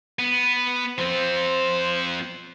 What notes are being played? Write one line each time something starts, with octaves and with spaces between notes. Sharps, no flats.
B3
F3 C4 C5